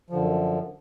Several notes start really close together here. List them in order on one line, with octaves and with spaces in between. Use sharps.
F3 D3 F#2